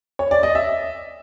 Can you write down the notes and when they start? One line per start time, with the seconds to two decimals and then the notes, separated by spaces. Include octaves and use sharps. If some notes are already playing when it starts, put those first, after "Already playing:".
0.19 C#5
0.31 D5
0.43 D#5
0.55 E5